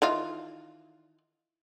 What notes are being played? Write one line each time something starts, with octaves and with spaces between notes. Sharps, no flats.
D#3 E3 F4